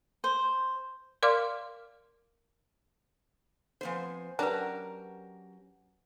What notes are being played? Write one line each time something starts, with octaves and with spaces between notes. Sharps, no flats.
C5
A#4 D5 F5 C6 D6 F6
C3 F3 B3 C5 G#5
F#3 C#4 D4 G4 A#4 B4 A#5